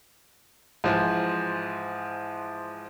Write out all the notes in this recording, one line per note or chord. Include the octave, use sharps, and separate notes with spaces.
G#2 E3 F3